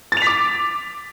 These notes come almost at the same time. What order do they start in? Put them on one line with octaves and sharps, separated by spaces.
A6 F7 B6 D6